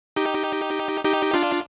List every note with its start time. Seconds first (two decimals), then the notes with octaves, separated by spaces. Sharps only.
0.16 D#4 G4
1.04 D#4 G4
1.34 D4 F4